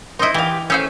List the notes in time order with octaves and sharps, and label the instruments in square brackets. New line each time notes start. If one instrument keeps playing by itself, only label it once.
[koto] D#4 E4 [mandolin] C5 D#5
[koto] E3 [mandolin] G4 F5
[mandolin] A3 E6 G6 [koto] C#4 C5